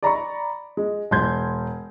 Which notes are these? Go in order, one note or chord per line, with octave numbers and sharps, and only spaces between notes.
D5 A#5 B5 C#6
G#3
E1 C6 G6 G#6